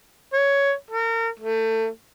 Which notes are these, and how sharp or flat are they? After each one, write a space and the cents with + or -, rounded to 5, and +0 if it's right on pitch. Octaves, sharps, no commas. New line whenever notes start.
C#5 +10
A#4 -35
A3 +25